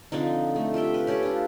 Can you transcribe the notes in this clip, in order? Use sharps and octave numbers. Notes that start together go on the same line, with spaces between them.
D3 F3 C4 D#4
A3
F4 G4 E5 G5
B4
C#4 G4 A4 D5
D4 F4